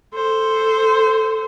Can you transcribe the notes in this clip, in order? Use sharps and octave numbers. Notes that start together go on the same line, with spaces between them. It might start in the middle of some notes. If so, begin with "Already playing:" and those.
A4 C5